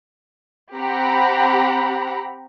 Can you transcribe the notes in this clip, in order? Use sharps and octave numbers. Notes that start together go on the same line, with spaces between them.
C4 G4 F#5 A#5 B5